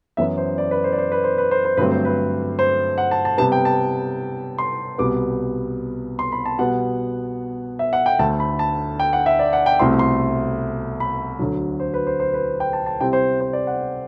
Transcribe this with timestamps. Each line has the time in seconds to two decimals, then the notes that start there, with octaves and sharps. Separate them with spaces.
0.17 F#2 E3 B3 E4 E5
0.37 C5
0.58 D5
0.71 B4
0.84 C5
0.92 D5
0.98 C5
1.12 B4
1.24 C5
1.38 B4
1.51 C5
1.65 C5
1.77 G2 D3 F#3 A3 C4 B4
1.92 C5
2.05 B4
2.59 C5
2.98 F#5
3.11 A5
3.25 A5
3.38 C3 G3 B3 A5
3.52 G5
3.65 A5
4.58 C6
4.98 C2 B2 G3 B3 D6
6.19 C6
6.32 B5
6.46 A5
6.59 B2 G3 B3 F#5
7.79 E5
7.93 F#5
8.06 G5
8.19 D2 D3 A3 A5
8.40 B5
8.59 A5
9.00 G5
9.13 F#5
9.26 E5
9.39 D5
9.53 F#5
9.66 G5
9.79 C2 B2 A3 C4 E4 C6
9.99 C6
11.00 B5
11.39 D2 D3 F#3
11.80 C5
11.94 B4
12.07 C5
12.20 C5
12.34 B4
12.60 G5
12.73 A5
12.86 A5
13.01 C3 G3 C4 E4 G5
13.13 C5
13.41 C5
13.53 D5
13.67 F#5